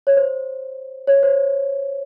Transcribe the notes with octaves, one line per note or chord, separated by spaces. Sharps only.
C#5
C5
C#5
C5